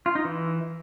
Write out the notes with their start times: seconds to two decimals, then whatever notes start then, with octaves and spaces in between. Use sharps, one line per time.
0.06 F4
0.15 D#4
0.25 E3